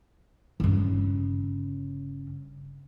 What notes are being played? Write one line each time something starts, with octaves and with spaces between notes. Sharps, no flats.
G1 C#3